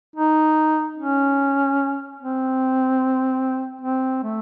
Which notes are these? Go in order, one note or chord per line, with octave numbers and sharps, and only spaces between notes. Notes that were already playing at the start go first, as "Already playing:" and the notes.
D#4
C#4
C4
C4
A3